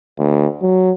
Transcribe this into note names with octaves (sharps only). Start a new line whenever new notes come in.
D2
F#3